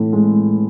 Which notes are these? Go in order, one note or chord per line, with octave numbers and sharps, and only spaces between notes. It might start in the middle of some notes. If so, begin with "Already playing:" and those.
Already playing: A2 E3
G#3